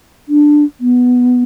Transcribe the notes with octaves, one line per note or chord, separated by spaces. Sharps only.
D4
B3